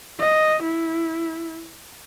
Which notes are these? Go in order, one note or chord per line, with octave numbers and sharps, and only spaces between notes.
D#5
E4